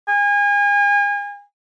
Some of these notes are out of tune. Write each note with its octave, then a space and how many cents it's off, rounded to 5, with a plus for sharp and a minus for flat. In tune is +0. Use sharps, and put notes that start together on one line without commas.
G#5 -35